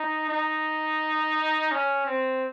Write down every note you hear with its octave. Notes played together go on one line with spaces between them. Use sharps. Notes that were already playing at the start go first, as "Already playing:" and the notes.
Already playing: D#4
D#4
C#4
C4